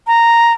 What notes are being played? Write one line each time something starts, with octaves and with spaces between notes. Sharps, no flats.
A#5